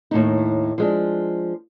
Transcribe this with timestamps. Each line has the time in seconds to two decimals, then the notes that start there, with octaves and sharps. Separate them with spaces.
0.11 D#2 A2 D#4
0.78 F3 G#3 D4